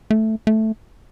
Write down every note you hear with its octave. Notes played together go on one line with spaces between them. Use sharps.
A3
A3